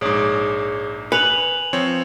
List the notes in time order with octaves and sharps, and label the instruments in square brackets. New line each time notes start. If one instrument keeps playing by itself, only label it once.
[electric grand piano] A#1 G#2 [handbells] G#4 C#5 D6
[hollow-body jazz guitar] B4 [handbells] G#5 [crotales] C#7 F7 F#7
[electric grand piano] F3 C4 C#5